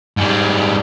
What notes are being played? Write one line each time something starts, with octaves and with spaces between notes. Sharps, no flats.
G#2 G3